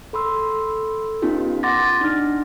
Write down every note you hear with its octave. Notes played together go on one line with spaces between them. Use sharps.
A4 B5 C6 E6
B3 C#4 D#4 F4 G4
F#5 C6 D6 A6 A#6
D4 D#4 F6